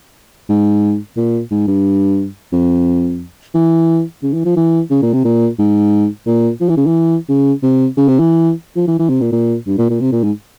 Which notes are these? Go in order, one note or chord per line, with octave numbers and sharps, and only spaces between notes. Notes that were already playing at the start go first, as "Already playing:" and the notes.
G#2
A#2
G#2
G2
F2
E3
C#3
E3
F3
E3
C#3
A#2
C3
A#2
G#2
A#2
F3
E3
C#3
E3
C#3
C3
C#3
C3
E3
F3
E3
E3
C3
A#2
A#2
G2
A#2
A#2
C3
A#2
G#2